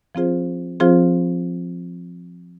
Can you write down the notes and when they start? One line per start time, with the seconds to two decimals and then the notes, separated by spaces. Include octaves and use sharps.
0.15 F3 C4 F4 G#4 C5
0.80 F3 C4 F4 G#4 C5